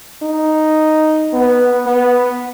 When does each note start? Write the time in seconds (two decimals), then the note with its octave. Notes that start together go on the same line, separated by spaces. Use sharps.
0.22 D#4
1.33 B3
1.86 B3